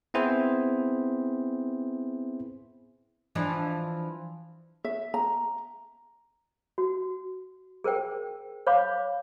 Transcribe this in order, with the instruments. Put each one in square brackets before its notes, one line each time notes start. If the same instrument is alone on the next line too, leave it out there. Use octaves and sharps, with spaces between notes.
[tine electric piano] B3 C4 E4 G#4 C5
[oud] E3 F3 D4
[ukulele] E5
A#5
[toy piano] F#4
G#4 A#4 C5 G5
C5 C#5 F5 B5 D6